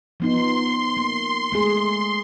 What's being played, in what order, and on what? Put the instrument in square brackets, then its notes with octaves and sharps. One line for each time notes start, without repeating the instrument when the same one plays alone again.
[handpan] F3 B3 D#4 [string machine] C6
[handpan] A#3
G#3 A3 G#4